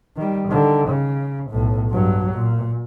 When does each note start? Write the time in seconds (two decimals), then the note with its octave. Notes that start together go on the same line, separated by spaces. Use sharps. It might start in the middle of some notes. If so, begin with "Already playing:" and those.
0.17 D#3 G3
0.48 D3 D#3
0.88 C#3
1.50 B1 A2
1.91 G2 F#3
2.33 A#2